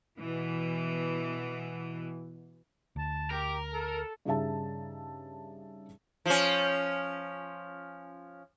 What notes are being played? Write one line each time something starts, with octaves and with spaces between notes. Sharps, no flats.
B2 E3
D2 A5
G4 A#4
A4
G2 C#3 D#4 G#4 E5 A5
F3 C#4